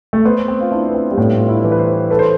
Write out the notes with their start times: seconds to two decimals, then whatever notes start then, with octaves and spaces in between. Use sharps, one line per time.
0.13 A3
0.25 B3 C5
0.48 C4
0.61 F4
0.71 D4 E4
0.90 B3
0.94 C4
1.11 G3
1.17 A2 A3
1.39 F4
1.49 E4
1.64 E3
1.72 B4
1.79 C5
2.10 A4 B4
2.19 C5